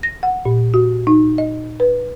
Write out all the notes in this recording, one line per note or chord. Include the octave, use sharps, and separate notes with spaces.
A#6
F#5
A#2
F#4
D#4
D#5
B4